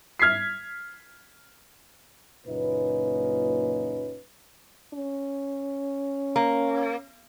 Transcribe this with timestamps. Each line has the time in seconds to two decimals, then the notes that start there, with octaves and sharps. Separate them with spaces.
0.19 F6 G#6 B6 C7
2.46 F#1 A#2 C#4 D#4 F4 B4
4.94 C#4
6.36 A#3